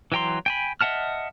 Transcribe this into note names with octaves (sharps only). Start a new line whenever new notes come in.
E3 F#3 G5 A#5 C6
G5 G#5 B5
D#5 E5 F#5 A5 F6